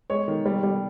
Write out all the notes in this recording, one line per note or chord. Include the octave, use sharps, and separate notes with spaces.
G#3 C#5
D#3
G3
G3